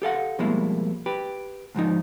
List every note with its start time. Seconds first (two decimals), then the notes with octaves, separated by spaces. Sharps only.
0.02 G4 A4 F5 F#5
0.39 F2 B2 G3 G#3 A#3 E4
1.06 G4 B4
1.75 D2 G#2 F3 D#4